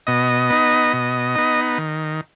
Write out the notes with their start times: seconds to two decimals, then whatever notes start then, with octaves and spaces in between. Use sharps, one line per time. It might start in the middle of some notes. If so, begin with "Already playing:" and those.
0.07 B2 D#5
0.50 B3 D#4
0.93 B2
1.35 B3 D#4
1.78 D#3